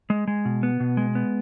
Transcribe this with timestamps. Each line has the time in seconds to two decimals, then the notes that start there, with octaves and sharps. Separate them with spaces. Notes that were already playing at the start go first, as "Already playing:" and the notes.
0.10 G#3
0.28 G#3
0.45 B2
0.63 B3
0.80 B2
0.97 G#3
1.15 B3